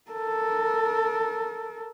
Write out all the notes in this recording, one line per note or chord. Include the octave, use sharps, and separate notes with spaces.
A4 A#4